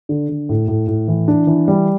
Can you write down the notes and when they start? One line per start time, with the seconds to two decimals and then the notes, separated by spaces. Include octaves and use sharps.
0.09 D3
0.29 D3
0.49 A2
0.68 A2
0.88 A2
1.08 E3
1.28 D4
1.47 E3
1.68 G3